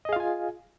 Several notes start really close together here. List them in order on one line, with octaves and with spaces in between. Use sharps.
D#5 G#4 F5 F4 G#5